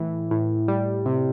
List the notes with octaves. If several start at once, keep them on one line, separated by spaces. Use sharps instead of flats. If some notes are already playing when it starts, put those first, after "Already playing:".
Already playing: A2 E3
A2
G3
C3